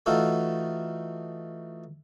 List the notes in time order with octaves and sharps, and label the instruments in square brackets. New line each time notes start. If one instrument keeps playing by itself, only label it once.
[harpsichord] E3 A3 D#4 F4 F#4 A4